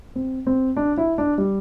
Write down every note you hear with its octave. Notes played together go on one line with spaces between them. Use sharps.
C4
C4
D4
E4
D4
G3